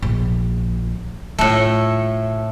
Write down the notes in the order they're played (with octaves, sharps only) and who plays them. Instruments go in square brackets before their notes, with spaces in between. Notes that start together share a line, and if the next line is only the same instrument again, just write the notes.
[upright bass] A#1
[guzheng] A2 A3 [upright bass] F4